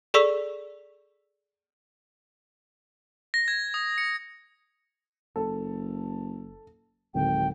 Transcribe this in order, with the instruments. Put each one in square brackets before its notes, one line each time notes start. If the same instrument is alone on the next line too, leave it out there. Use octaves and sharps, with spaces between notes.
[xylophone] G#4 A4 D5 C#6 E6 B6
[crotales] A#6
G#6
D#6
C#7
[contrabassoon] F#1 [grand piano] A4
[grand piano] D1 [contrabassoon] G#1 [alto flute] G5